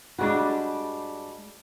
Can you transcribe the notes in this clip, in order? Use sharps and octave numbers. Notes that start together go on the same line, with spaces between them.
G2 G3 G#3 D4 F#4